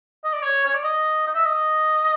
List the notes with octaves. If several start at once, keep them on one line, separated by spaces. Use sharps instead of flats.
D#5
D5
C#5
C#5
D5
D#5
D#5
E5
D#5